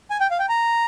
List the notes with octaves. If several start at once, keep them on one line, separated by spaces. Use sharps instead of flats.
G#5
G5
F5
G5
A#5